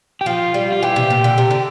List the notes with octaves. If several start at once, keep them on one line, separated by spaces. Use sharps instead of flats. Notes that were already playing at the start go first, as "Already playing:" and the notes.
G4
F3 F4
G3
F4
E3 G4
C3
A#2
D3
C3
D3